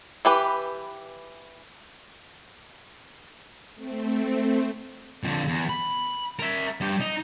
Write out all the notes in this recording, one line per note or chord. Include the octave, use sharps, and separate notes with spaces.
E3 G4 B4
A3 C4
F2 D3
E2
B5
A#4 E5
G2 G4
D#4